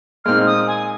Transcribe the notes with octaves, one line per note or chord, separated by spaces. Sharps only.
A#2 G#3 C4 D#4 F6
D#6
G#5